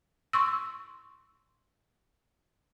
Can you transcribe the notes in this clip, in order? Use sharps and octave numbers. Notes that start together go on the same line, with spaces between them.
C6 C#6 E6